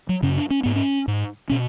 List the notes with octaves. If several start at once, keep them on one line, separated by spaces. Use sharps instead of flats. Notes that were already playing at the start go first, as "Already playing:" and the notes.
F#3
F#2 C#3 C#4
D4
C#4
G#2 B3
C#4
G#2
B2 C#4